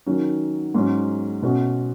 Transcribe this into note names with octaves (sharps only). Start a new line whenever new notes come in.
D#3 F#3 C#4
G#2 F#3 C#4
B2 A3 C#4 F#4